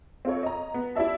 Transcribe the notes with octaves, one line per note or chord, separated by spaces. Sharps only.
C4 F4 A4 C#5
D#5 A#5
B3
E4 G4 D5 E5 A5